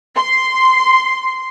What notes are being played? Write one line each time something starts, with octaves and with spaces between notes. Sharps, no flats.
C6